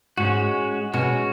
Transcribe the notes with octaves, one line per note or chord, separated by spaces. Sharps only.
G#2 G#3 C#4 F#4
B2 G#3 C#4 F#4